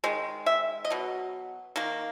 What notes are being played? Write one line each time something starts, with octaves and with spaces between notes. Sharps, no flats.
D#3 G#3
E5
D#5
B2 F#3
D#3 A#3